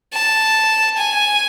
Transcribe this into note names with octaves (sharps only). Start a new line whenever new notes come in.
A5
G#5